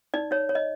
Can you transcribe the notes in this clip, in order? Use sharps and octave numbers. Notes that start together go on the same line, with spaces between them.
D#4 D5
D#4 C#5
C#5
D#5